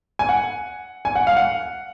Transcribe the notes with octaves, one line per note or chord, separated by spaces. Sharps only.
G#5
F#5
G#5
F#5
F5
F#5